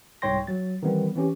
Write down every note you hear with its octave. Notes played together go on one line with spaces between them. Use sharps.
C2 G#2 C#5 G5 C6 A#6
F#3 A6
D#3 E3 G3 B3 C4
E3 C4 C#4 G4